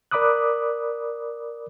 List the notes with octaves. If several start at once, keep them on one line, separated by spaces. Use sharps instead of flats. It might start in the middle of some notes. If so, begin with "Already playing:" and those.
A#4 D5 B5 D6 D#6 F#6